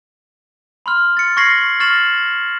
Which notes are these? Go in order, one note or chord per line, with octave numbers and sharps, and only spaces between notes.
B5 C6 F6
A6 C#7
C#6 F6 G#6 A#6 C7 F#7
C#6 F6 A6 A#6 E7 F#7